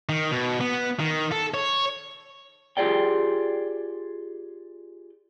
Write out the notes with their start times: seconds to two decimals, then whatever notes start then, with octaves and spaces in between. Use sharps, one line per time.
0.09 D#3
0.31 B2
0.61 B3
1.00 D#3
1.32 A4
1.54 C#5
2.77 F4 G4 G#4 D5 G5